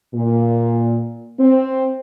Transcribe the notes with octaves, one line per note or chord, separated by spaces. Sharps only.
A#2
C4